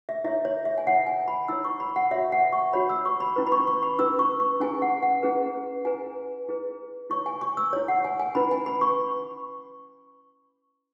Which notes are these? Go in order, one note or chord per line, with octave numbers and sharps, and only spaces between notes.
E5
E4 C#5 E5
C#5
E5
G#5
E4 C#5 F#5
G#5
B5
E4 C#5 E6
C#6
B5
F#5
F#4 C#5 E5
F#5
C#6
F#4 C#5 B5
E6
C#6
B5
C#4 E4 B4
B5
C#6
C#6
B5
C#4 E4 B4 E6
C#6
C#6
C#4 E4 G#4 B4 G#5
F#5
F#5
C#4 E4 G#4 B4
E4 G#4 B4 G#5
E4 G#4 B4
E4 C#5 C#6
G#5
C#6
E6
E4 C#5
F#5
G#5
G#5
C#4 E4 B4 B5
G#5
B5
C#6